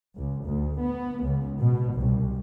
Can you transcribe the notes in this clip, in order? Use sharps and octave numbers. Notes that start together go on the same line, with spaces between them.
C#2
D2
B3
C#2
B2
C2